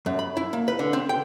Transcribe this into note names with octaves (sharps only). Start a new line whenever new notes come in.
F#2
B5
E4
A#3
B4
D3
C4
G5